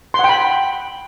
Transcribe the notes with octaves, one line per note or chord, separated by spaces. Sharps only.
F#5 G5 B5 C6